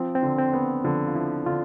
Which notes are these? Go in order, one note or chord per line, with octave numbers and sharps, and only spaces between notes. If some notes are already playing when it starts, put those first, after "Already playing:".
Already playing: F3 C4
C4
D3
C4
B3
D3 F3
F4
F3 E4
D3 F4